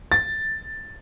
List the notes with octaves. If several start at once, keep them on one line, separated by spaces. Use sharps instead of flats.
A6